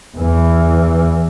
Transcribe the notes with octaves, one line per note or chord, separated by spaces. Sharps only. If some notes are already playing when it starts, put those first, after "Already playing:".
E2 E3